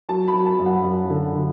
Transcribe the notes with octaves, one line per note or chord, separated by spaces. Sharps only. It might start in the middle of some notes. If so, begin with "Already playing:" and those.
F#3 A5
B5
F#3
A5
F#2
F#5
F#2
D3
D3